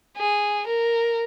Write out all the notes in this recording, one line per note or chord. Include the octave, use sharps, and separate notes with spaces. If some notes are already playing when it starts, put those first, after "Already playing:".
G#4
A#4